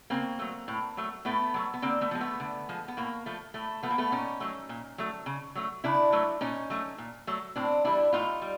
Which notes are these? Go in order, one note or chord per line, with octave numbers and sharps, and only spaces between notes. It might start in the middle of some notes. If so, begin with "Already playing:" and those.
C#3 A#3 C4
F#3 A3
A2
F#3 A3
A2 A3 B3
F#3 A3
B3
D3 A#3 C4
A3 B3
F3 G#3
A3 B3
D3
F3 G#3
B3
A2 A#3
F3 A3
A2 A3
F3 A3 B3
A#3
A3 B3
A#2 C#4 D#4
F#3 A3
A#2
F#3 A3
C#3
F#3 A3
C#3 D4 E4
F#3 A3
A#2 C#4 D#4
F#3 A3
A#2
F#3 A3
A2 C4 D4
E3 G3 D4 E4
A2 D#4 F4
G3